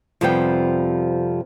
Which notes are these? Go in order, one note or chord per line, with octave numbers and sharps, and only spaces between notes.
F2 C3 F3 G3 B3 G5